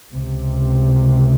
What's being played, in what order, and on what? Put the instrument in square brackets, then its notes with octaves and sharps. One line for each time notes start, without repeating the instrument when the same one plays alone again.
[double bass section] C#2 C3